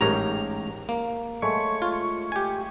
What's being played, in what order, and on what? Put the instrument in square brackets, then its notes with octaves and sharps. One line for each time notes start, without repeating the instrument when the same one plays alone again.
[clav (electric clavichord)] A1 G#2 C#5 [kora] G4 A#4 [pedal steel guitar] A#5
[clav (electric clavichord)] A#3
[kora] G#3 A3 [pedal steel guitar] C#5
[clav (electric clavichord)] F4
G4 G#5